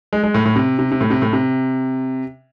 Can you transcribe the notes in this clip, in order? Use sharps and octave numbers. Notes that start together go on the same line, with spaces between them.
G#3
G#3
A2
A2
C3
C3
C3
A2
C3
A2
C3